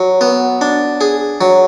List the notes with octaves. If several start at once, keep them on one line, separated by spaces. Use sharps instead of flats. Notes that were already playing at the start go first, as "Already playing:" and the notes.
Already playing: F#3
B3
D4
G#4
F#3